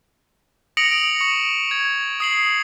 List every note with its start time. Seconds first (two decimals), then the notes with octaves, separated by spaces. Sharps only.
0.77 D#6 A#6 C#7 D7 F7 F#7
0.92 D7
1.20 C#6 C#7
1.71 G#6
2.20 D#6 C7 F#7